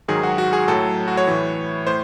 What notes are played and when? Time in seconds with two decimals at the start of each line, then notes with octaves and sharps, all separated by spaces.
0.08 G#2 D#3 F#3 G#4
0.23 F#4
0.38 F#4
0.53 G#4
0.68 A2 F#3 A4
1.08 F#4
1.17 C#5
1.27 A2 E3
1.87 A2 C5